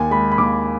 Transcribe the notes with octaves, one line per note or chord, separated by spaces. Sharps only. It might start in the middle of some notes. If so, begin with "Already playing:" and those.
Already playing: D#2 G#5
G#3 B5
B5
D#2 D6